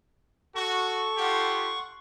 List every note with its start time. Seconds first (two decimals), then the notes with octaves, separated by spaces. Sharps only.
0.56 F#4 A4 C#6
1.18 F4 G4 F#5 C6